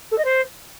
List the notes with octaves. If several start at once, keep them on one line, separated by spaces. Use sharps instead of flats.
A4
D#5
C5